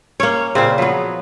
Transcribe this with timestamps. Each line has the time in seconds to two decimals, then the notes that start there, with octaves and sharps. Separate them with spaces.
0.20 A#3 C#4 C#5
0.55 A#2 C#3 C4
0.78 F3 F#3 B3